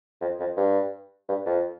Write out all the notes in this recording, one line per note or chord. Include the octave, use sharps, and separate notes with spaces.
F2
F2
G2
G2
F2